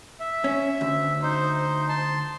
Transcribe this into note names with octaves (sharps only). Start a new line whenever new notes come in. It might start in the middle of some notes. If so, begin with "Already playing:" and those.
E5
C#4
D2
D#4 C5
A5 C6